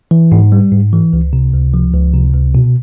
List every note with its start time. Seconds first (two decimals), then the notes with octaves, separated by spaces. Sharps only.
0.11 E3
0.32 G#2
0.52 G3
0.72 G#2
0.93 E3
1.13 C#2
1.33 C3
1.53 C#2
1.74 F3
1.94 C#2
2.14 C3
2.34 C#2
2.55 B2